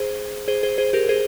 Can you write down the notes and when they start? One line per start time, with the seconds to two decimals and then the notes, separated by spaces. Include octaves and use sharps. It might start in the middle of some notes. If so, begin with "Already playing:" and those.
Already playing: G#4 C5
0.48 G#4 C5
0.63 G#4 C5
0.78 G#4 C5
0.93 G4 A#4
1.09 G#4 C5